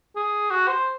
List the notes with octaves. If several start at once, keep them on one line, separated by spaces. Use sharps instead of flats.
G#4
F#4
C5